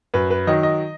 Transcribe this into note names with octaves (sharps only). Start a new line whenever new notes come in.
F#2 B4
B4
D#3 F#3 D#5
D#5